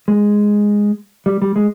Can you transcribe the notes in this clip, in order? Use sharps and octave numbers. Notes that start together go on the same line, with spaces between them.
G#3
G3
G3
G#3